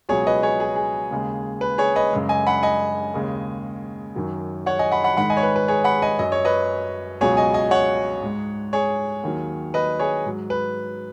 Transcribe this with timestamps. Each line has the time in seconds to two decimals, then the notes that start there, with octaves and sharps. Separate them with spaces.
0.09 C#2 B2 F#3 G#4 C#5
0.27 B4 D#5
0.43 G#4 C#5
0.60 G#4
0.76 G#4
1.11 D#2 C#3 G#3
1.61 B4
1.78 G#4 C#5
1.96 B4 D#5
2.13 F#2 C#3 G#3
2.29 D#5 G#5
2.47 F#5 B5
2.63 D#5 G#5
3.14 D#2 C#3 G#3
4.16 F#2 D#3 F#3
4.66 C#5 F#5
4.79 D#5 G#5
4.92 F#5 B5
5.04 F#5 B5
5.17 G#2 D#3 G#3 F#5 B5
5.30 D#5 G#5
5.37 C#5
5.43 B4
5.56 B4
5.68 G#4 C#5
5.84 F#5 B5
6.02 D#5 G#5
6.19 F#2 F#3 D#5
6.32 C#5
6.45 B4 D#5
7.21 C#2 B2 F#3 G#4 C#5
7.37 D#5 G#5
7.54 D#5 G#5
7.71 C#5 F#5
8.22 G#2 G#3
8.73 G#4 C#5
9.23 D#2 D#3 F#3
9.74 B4 D#5
10.00 G#4 C#5
10.25 G#2 F#3
10.50 B4